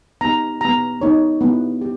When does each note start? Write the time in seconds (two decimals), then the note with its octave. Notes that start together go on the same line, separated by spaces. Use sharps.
0.21 B3 D#4 G4 A#5
0.61 B3 G4 A#5
1.01 B3 D#4 G4 C#5
1.41 B3 E4 G4
1.82 G4